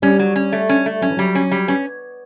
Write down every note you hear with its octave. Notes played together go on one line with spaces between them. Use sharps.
G3 C#4
F#3
C#4
A3
C#4
A3
F#3 C#4
E3
F#3 G3
C#4
G3
B3 C#4